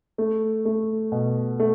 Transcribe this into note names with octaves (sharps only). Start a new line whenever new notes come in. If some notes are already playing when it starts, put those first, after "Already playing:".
A3
A3
B2
A3